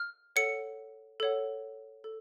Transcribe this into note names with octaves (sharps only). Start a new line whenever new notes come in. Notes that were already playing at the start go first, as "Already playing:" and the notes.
Already playing: F6
A4 C#5 F#5 C#7
A4 C#5 F#5
A4